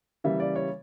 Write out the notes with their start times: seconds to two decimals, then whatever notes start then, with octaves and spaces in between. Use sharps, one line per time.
0.24 C#3 E3 G3 A#3 E5
0.40 D5
0.56 C#5